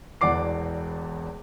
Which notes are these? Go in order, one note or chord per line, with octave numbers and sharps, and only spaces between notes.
E1 E2 D5 F#5 D6 C7